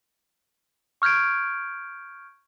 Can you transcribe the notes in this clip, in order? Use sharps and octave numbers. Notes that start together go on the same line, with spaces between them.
C#6 F6 G6 G#6 D7